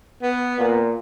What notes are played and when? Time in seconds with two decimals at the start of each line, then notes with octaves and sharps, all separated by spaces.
0.23 B3
0.59 A#2